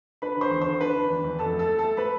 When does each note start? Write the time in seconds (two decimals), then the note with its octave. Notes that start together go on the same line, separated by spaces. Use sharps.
0.22 D4 B4 B5
0.36 D3 C5 C6
0.51 E2
0.62 D3 C5 C6
0.81 D4 B4 B5
0.96 D4
1.10 E2
1.24 E2
1.39 F2 A4 A5
1.53 A3
1.59 A4 A5
1.68 A3
1.79 A3 A4 A5
1.97 A3 B4 B5